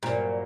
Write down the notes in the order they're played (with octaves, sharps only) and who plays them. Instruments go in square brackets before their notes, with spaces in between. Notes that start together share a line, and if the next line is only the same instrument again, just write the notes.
[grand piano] G2 F#3 A#3 F#4 C5 [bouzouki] A#2